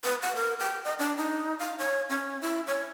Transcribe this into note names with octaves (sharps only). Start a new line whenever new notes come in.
B4
F#5
A#4
G5
D#5
D4
D#4
F5
C#5
C#4
E4
C#5